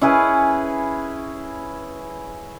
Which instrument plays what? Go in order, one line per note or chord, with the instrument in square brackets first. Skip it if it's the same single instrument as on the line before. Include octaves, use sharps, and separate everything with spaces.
[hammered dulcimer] C#4 E4 G#4 B4